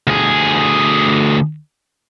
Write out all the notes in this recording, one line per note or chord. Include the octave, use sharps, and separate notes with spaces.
D2 G#4